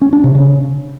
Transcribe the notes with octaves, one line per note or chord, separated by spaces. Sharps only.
C#4
D4
C3
C#3